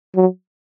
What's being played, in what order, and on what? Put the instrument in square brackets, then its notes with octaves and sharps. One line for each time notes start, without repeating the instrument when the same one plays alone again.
[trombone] F#3